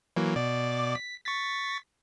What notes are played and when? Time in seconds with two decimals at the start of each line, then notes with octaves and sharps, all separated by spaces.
0.16 E3 F#3 A#3
0.36 B2 D5 D6
0.95 B6
1.24 C#6 A6 B6